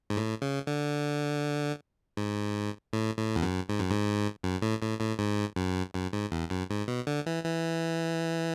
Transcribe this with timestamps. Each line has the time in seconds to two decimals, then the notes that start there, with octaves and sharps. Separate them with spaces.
0.10 G#2
0.17 A2
0.42 C#3
0.67 D3
2.17 G#2
2.93 A2
3.18 A2
3.36 E2
3.43 F#2
3.69 G#2
3.79 F#2
3.91 G#2
4.43 F#2
4.62 A2
4.81 A2
5.00 A2
5.19 G#2
5.56 F#2
5.94 F#2
6.13 G#2
6.32 E2
6.50 F#2
6.70 G#2
6.88 B2
7.07 D3
7.26 E3
7.44 E3